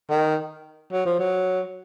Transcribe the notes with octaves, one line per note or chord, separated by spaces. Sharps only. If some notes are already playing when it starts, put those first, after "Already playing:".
D#3
F#3
F3
F#3